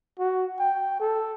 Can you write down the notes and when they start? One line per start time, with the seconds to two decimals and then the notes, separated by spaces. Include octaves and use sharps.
0.19 F#4
0.59 G5
1.00 A4